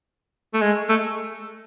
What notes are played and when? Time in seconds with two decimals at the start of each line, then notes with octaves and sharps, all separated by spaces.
0.54 A3
0.61 G#3
0.89 A3